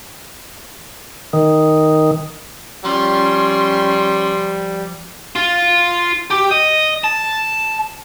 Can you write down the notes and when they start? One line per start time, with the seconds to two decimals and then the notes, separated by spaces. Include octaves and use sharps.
1.33 D#3
2.85 F3 G3 C#4 C6
5.36 F4
6.30 G4
6.51 D#5
7.04 A5